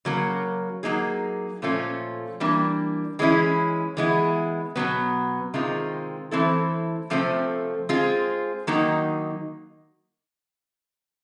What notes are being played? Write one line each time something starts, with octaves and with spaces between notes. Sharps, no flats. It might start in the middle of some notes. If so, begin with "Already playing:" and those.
C#3 F#3 A#3
F#3 A#3 D#4 G#4
A#2 F3 A3 C#4 F4
E3 G3 A#3 D4
E3 G#3 C#4 E4
E3 G#3 B3 E4
B2 F#3 B3
C3 D#3 G#3 C4 F4
E3 A3 C4 E4 A4
C3 F3 A3 C4
G#3 C4 F4 G#4
D#3 F#3 A#3 D#4